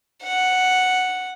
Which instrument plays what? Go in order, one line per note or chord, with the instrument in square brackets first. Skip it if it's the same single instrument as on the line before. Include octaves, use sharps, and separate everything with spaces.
[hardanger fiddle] F#5